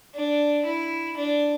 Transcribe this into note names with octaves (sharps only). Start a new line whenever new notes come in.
D4
E4
D4